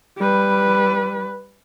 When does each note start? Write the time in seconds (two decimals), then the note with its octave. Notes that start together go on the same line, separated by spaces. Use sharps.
0.18 G3 B4